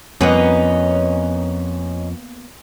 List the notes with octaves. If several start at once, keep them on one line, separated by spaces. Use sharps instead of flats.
F2 A#3 B3 C#4 D#4 B4